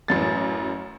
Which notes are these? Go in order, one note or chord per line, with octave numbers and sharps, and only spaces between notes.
A1 F#2 A6